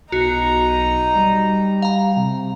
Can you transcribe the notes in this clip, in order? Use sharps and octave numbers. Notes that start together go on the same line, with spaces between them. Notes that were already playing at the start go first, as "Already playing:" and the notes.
B1 D#4 F#4 A#5
G3
F5 A#5
C3